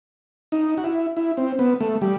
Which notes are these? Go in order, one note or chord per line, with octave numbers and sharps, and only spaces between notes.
D#4
F#4
E4
E4
C4
B3
A3
G3